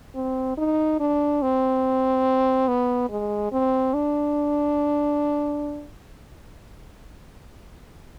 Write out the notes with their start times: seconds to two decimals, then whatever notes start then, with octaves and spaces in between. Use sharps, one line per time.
0.15 C4
0.58 D#4
1.00 D4
1.42 C4
2.68 B3
3.10 G#3
3.52 C4
3.94 D4